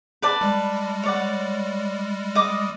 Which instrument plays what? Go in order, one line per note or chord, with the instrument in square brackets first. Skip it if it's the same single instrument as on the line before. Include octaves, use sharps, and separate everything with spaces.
[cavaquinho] B4 D5 A5
[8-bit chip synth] G3 G#3
[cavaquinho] C#5 D5 F#5
D#5 D6